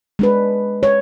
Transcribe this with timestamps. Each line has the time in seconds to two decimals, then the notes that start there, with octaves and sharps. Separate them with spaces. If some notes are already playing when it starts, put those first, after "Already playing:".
0.19 G#3 D4 B4
0.83 C#5